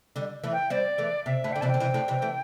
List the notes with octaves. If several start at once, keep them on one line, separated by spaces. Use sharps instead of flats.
D3 G3
E3 A3
G5
G3 C4 D5
E3 A3
C3 E5
A2 D3
G5
D3
C3 E3 A5
G5
D3
C3 E3
A2 D3
C3 E3
E3 A3